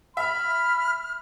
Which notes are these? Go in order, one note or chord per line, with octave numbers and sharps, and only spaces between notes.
E5 B5 F6